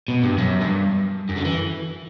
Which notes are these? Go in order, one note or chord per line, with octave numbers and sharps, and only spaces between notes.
B2
G2
F#2
G2
F#2
D3
E3